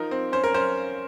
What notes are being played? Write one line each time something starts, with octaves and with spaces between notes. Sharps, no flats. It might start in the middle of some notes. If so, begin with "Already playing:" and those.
Already playing: F3 D#4 A#4
C4
C#4 C5
A#4
C#4 C5